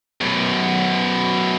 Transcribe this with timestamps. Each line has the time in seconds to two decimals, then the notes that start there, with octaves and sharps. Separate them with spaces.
0.21 F#2 B2